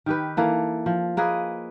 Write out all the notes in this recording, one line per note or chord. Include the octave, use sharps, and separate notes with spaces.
D#3 G4 B4
E3 A#3 A4
F3
A#3 G#4 B4 D#5